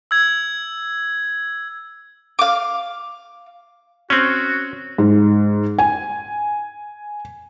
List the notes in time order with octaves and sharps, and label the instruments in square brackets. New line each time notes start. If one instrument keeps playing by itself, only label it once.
[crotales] E6 G#6
[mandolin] F5 D6
[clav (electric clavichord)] C4 C#4 [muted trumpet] F#4
[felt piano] G#2
G#5